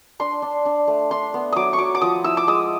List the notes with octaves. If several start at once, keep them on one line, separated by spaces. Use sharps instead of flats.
D4 C6
D4
D4
A3
D4 C6
B3
F#3 D6 D#6
C#6
F#3 D6
D6
F3 D#6
E4 E6
D6
G#3 D#6